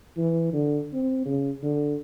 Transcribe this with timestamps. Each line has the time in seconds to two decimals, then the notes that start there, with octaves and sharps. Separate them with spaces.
0.17 E3
0.53 D3
0.93 C4
1.25 C#3
1.63 D3